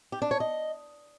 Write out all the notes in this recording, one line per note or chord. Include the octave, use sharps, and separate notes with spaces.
G4
D4
C#5
D#5